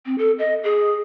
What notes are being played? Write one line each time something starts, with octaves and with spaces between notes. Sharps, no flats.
C4
A4
D#5
G#4